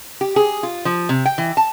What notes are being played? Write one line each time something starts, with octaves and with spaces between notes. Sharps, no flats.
G4
G#4
F4
F3
C3
G5
E3
A5